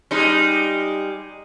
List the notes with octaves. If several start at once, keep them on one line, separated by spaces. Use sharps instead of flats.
G3 G#3 D#4